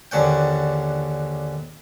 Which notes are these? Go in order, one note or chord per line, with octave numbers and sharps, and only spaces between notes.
A#1 D#2 D3 C#4 F#5 G5